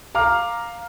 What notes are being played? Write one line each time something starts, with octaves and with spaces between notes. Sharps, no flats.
F5 A#5 D6 F6